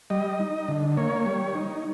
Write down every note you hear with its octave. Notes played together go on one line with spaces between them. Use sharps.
G3 D#5
D#4
D3
A#3 C#5
G3
D#4